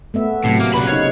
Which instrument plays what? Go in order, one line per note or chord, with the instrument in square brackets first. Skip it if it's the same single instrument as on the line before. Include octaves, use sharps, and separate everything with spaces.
[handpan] A3 B3 E5
[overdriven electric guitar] A2 [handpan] C3 F#3
[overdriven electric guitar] A#3
[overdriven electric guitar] A#2 B5 [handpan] C#3 B4
[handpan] D#4 F5 [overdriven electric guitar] C#5